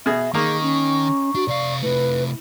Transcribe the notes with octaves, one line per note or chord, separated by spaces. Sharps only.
B2 G#4 E5
D#3 A#3 D#4 G#4 C#6
C#4
D4 F#4
C3 D5 F5
C3 A3 E4 B4